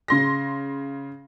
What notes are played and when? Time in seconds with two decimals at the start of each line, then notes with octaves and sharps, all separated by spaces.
0.08 C#3 C6 A#6